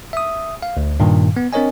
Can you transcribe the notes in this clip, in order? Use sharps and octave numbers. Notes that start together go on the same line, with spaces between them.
E5 D#6
F5
D2
G2 A#2 D#3
B3
C4 D4 A#4 C#5 D#5 G#5